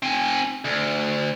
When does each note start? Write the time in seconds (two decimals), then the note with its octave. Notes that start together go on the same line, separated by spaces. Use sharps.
0.03 C4 G#5
0.65 D2